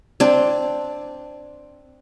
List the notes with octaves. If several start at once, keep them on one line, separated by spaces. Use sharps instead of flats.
C4 D4